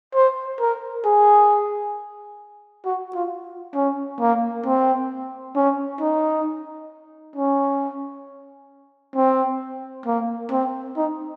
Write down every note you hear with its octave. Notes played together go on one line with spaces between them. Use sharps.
C5
A#4
G#4
F#4
F4
C#4
A#3
C4
C#4
D#4
C#4
C4
A#3
C4
D#4